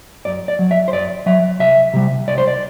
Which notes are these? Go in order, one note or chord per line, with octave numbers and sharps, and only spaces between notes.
F#2 D5
D5
F#3
E5
C5
F#2 D5
F#3 E5
C2 E5
C3 G3
C2 D5
C5
D5